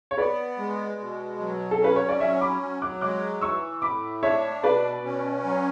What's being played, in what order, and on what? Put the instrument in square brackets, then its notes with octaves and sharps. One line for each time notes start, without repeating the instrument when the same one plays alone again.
[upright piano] C#5
[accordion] B3 [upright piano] B4 D5
[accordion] G#3
B2
F#3
[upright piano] A4
[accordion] C#4 [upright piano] B4
[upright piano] C#5
D5
[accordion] F#3 [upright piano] C#5 E5
[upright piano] B5 D6
[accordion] F#3
[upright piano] D6 F#6
[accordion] G#3 [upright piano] D6 F#6
[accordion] E3 [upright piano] C#6 E6
[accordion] A2 [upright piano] B5 D6
[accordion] D4 [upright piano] C#5 E5
[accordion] B2 [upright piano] B4 D5
[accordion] C#4
F#3